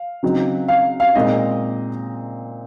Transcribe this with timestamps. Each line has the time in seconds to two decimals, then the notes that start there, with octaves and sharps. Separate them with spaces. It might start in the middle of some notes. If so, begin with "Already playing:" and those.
Already playing: F5
0.23 C#3 F#3 C4 D#4
0.68 F5
1.00 F5
1.15 A#2 G#3 C4 D#4 D#5